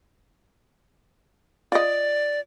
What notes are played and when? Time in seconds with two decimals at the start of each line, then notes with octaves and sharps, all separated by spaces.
1.72 F4 D5 D#5